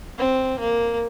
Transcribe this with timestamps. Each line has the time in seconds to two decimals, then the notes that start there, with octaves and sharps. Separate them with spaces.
0.18 C4
0.59 A#3